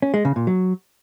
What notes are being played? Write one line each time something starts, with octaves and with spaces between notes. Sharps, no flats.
C#4
G#3
C#3
A#2
F#3